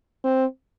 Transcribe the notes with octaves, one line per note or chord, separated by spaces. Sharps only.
C4